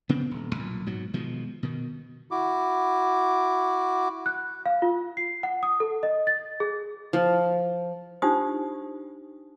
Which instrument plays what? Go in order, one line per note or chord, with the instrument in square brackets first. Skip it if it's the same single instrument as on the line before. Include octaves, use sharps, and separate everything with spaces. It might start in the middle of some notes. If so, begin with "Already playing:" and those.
[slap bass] C#3 B3 C4
D#1
B1 A#2
G#2 B2 F#3
B2 D#3 F3 G#3
B2 D#3
[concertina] E4 F#4 D6
[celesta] F#6
F5
F4
C7
F#5
D#6
A4
D#5
A6
G#4
[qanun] F3
[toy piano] D4 D#4 F4 G4 C5 D#6